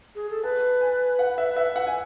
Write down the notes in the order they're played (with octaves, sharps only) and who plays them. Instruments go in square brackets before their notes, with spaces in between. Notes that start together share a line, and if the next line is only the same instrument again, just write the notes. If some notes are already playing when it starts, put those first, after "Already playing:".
[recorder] G#4
A4
[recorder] B4 [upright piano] A5
[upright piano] G#5
F#5
E5
E5
F#5
G#5